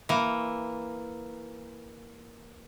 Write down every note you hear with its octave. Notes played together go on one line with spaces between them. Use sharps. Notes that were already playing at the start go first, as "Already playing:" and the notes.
E3 A#3